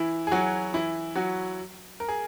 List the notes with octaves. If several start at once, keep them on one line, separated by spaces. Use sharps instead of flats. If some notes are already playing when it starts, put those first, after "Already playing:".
Already playing: E3 E4
G#4
F#3 F#4
E3 E4
F#3 F#4
A#4
G#4